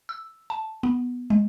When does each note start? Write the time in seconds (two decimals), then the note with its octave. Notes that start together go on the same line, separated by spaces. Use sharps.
0.09 E6
0.50 A5
0.83 B3
1.30 G#3